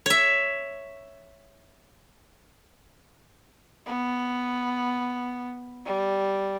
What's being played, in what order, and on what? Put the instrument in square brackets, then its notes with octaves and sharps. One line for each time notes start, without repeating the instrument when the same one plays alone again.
[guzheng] C#5 E5
[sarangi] B3
G3